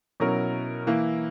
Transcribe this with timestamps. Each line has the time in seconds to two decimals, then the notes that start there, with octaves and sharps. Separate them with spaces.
0.20 B2 F#3 C#4 E4 A#4
0.87 E3 A#3 E4